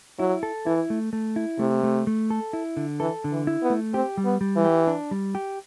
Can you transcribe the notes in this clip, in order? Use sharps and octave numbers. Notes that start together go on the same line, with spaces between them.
F#3 E4
A4
E3 E4
A3
A3
E4
C3 A3
A3
A3
A4
E4
D3
E3 A4
D3
E3
E4
B3
A3
C4 G4
G3
B3
G3
E3
G4
D4
G3
G4